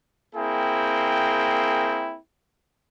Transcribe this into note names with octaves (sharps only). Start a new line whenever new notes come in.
A#3 C4 E4 G#4 G5